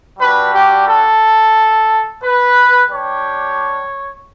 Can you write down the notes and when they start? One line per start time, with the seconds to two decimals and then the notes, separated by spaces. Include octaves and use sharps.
0.19 G3 D4 F#4 B4
0.53 G4
0.87 A4
2.23 B4
2.90 G3 D4 G4 C#5